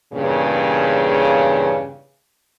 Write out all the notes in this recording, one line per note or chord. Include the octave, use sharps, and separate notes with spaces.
E2 G2 A#2 C#3